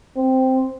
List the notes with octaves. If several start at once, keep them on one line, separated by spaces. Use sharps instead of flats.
C4